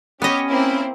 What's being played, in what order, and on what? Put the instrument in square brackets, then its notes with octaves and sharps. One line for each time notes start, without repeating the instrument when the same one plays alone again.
[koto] B3 D#5 [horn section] C#4 [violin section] G4 C#5
[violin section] A#3 C4 E4